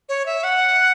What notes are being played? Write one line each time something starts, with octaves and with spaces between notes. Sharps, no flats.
C#5
E5
F#5